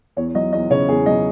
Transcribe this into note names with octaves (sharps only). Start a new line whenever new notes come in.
E2 C#5
F#3 D#5
E2 D#5
C#3 C#5
E2 G#4
F#3 D#5